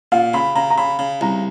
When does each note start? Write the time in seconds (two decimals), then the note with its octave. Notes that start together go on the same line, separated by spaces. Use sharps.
0.12 A#2 F5
0.34 C#3 B5
0.55 C#3 A#5
0.70 A#5
0.78 C#3 B5
0.99 C#3
1.21 C2 A#5